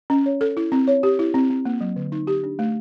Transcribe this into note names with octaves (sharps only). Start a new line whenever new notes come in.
C#4
C#5
A4
E4
C4
C#5
G4
E4
C4
C4
A#3
F#3
D3
D#4
G4
D4
A3